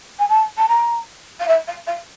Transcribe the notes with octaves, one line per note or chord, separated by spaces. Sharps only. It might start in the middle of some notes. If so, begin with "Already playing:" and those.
G#5
A5
A5
A#5
F5
E5
F5
F5